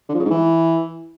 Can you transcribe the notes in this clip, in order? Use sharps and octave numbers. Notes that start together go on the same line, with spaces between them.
D3
F3
C#3
G#2
E3